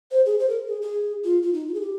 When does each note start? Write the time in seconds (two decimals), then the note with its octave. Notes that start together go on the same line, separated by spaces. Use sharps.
0.12 C5
0.26 G#4
0.39 C5
0.49 A#4
0.68 G#4
0.82 G#4
1.24 F4
1.43 F4
1.53 D#4
1.68 F4
1.74 G#4
1.81 G4